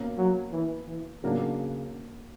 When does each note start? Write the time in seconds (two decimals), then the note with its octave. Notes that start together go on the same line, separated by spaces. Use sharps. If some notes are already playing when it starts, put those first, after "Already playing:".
Already playing: B2 A#3 C#4
0.18 F#3
0.52 E3
0.87 E3
1.23 C#3 F#3 A#3 D4